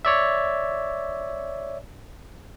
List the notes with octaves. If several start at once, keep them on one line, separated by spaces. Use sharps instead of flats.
C#5 D5 E5